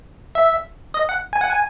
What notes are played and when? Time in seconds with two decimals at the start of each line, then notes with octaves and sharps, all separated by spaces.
0.35 E5
0.94 D#5
1.09 F#5
1.33 G#5
1.41 F#5
1.50 G#5